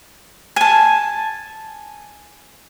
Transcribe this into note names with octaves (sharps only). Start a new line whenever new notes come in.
G#5 A5